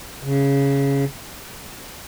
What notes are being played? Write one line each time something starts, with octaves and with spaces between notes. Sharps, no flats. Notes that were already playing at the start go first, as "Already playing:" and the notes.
C#3